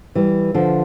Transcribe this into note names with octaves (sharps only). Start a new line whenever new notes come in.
E3 G3
D3 F3